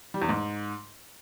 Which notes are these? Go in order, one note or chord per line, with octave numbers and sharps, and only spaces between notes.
G3
E2
G#2